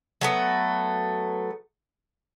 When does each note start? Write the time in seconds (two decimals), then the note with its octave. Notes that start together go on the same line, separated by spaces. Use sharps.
0.21 F#3 A3 B3